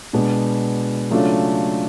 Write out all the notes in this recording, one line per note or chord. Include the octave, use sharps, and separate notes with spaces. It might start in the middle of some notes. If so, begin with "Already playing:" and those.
B2 G#3 B3 D4
C#3 F#3 A3 D4 F4